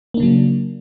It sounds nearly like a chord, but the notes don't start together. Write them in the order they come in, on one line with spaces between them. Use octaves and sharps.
A#3 D4 C#3 F#3